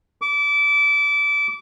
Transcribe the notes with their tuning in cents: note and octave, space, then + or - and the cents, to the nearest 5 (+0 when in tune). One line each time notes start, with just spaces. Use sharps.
D6 -25